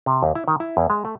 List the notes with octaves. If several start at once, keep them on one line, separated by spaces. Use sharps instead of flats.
C3
D#2
E4
D#3
E4
E2
G#3
A3